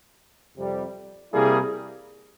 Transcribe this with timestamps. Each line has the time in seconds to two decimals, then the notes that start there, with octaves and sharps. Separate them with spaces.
0.56 F2 C3 G3
1.33 C3 G3 A#3 E4 G#4